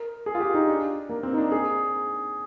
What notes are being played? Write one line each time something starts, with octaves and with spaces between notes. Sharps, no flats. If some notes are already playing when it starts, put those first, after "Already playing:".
Already playing: A#4
G#4
F4
G4
D#4
D4
A#3
C4
D#4
D4
G#4